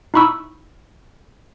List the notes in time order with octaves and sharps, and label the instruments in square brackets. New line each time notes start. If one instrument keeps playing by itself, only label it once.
[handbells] D#4 E4 B5 C#6 E6